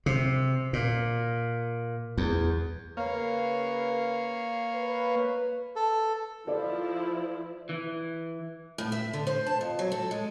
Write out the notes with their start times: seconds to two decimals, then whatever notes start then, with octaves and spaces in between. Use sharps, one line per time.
0.06 C3
0.73 A#2
2.18 E2
2.97 C#3 A#3 A#4 B4 C#5 F5
4.75 B4
5.76 A4
6.47 F3 E4 A4 D5
7.69 E3
8.78 A2
8.92 E5
9.13 D3
9.27 C5
9.46 A5
9.61 F2
9.79 F#3
9.92 A4
10.11 G#3